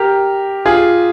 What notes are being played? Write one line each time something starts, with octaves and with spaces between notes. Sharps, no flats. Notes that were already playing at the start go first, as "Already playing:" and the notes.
Already playing: G4 A#4
F4 G#4